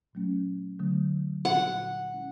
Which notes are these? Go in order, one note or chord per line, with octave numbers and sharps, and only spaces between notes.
A#2 F#3 A3 C#4
D3 F#3 A3
A#2 G3 B3 D#4 F#4 F#5
G#3 C#4 E4